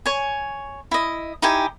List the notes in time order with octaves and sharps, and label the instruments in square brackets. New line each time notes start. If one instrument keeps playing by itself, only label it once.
[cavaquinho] C#5 G#5
E4 D#5
D#4 E4 G4 G#5